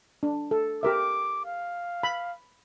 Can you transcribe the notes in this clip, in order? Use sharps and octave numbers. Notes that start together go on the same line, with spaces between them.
D4
A4
G4 A#4 E5 D6
F5
B5